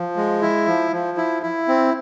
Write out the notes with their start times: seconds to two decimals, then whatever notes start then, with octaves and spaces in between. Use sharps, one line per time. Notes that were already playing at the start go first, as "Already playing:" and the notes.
Already playing: F3
0.16 G#3
0.41 E4
0.67 F3
0.92 F3
1.17 E4
1.43 E4
1.68 C4